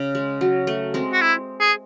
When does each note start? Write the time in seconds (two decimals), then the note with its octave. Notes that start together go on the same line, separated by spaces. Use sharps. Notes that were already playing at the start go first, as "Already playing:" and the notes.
Already playing: C#3
0.15 G#3
0.41 F#3
0.67 A3
0.94 G#3 C4
1.13 F#4
1.21 E4
1.60 G#4